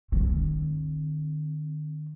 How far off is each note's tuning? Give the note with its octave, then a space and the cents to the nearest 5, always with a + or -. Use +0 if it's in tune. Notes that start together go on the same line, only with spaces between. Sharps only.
D#3 -45 C4 +15